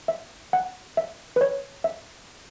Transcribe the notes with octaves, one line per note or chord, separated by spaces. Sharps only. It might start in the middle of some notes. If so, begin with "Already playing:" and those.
E5
F#5
E5
B4
C#5
E5